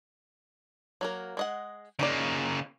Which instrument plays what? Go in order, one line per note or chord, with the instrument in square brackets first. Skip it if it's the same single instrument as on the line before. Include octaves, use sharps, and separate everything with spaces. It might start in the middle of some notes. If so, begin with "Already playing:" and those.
[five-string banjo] F#3 A#3 A#4
G#3 D#5 F#5
[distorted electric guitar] C#3 A#3 [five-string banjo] D#4 F4 D5